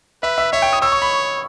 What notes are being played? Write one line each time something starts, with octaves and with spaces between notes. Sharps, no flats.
B4 E5
E5
C#5 E5
G5
D#6
C#5 E6
C#6
B5